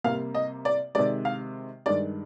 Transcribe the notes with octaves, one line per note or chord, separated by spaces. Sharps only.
C3 G3 A#3 F5
D#5
D5
C3 D#3 G#3 D5
F5
G2 D#3 G#3 D5